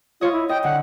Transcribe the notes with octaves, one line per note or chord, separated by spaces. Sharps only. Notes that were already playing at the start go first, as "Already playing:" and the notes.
F4 C#5 D#5
E4
D#5 G5
D3 F#5